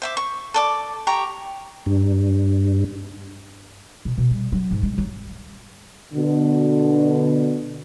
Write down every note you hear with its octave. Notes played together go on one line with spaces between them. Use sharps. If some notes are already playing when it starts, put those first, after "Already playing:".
C5 E5 D6
C#6
A4 D5 D6
G4 A#5 C#6
G2
B2
B2
G3
F#3
G#2
G#3
F#3
B2 D3